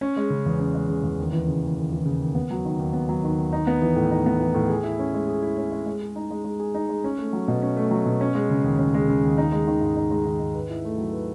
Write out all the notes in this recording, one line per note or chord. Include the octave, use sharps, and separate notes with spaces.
C#4
G#3
C#3
E2
C#4
G#3
C#3
E2
D#2
E3
C#3
D#2
D#2
E3
C#3
D#2
B3
F#3
D#3
D#2
B3
F#3
D#3
D#2
D#4
B3
E3
A2
D#4
B3
E3
A2
G#4
E4
C#4
G#3
G#4
E4
C#4
G#3
G#3
G#4
D#4
G#3
G#3
G#4
D#4
G#3
C#4
A3
F#3
B2
C#4
A3
F#3
B2
C#4
G#3
C#3
D#2
C#4
G#3
C#3
D#2
D#4
G#3
D#3
G#2
D#4
G#3
D#3
G#2
B4
E4
A3
F#3
B4